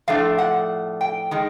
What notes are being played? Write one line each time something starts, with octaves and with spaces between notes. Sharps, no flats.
A2 F3 A3 D4 F5
F#5
G5
D#3 G#3